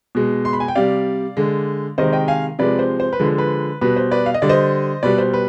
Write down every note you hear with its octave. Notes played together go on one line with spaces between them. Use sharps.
B2 G#3
C6
B5
G#5
G5
C3 G3 D5 F5
D3 G#3
C3 D#3 G#3 C5 D#5
D#5 G5
F5 G#5
C3 F3 G#3 B4 D5
C5
C5
B4
D3 F3 G#3
B4
B2 G3 B4
C5
B4 D5
F5
D#5
D3 G3 D5
C5 D#5
B2 G3 B4 D5
C5
B4